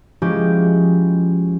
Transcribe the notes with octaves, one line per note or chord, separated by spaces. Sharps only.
F3 G#3 C#4 E4 G4